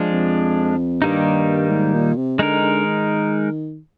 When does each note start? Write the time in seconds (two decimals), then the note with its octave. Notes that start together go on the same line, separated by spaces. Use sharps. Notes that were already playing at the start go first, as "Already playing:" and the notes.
Already playing: F3 G#3 D4
0.12 F2
1.02 G2 D#3 G3 A#3 D#4
1.70 G#2
1.94 A#2
2.17 C3
2.39 D3 G#3 D#4 A#4
2.62 D3
2.85 D#3